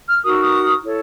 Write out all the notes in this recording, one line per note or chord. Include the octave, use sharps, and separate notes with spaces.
F6
D#4 F#4 A#4 D#6
E6
D#6
E4 A4 C#5